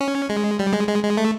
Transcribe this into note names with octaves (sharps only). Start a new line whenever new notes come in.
C#4
G#3
G3
G#3
G#3
G#3
A3